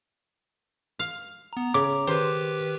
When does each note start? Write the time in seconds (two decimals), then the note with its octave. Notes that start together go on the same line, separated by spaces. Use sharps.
0.99 F5
1.53 B3 A#5
1.74 C#3 A#5 D6
2.07 D#3 G4 B4 C5